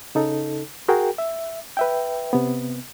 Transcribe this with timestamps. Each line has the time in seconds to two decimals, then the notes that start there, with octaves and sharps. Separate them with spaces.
0.15 C#3 D#4 A4
0.88 F#4 G#4 A#4 G5
1.18 E5
1.77 B4 E5 G5
2.33 C3 B3